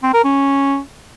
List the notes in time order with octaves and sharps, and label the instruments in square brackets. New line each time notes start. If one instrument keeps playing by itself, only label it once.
[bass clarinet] C4
A#4
C#4